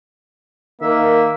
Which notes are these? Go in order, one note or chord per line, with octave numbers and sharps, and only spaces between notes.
D#3 A#3 E5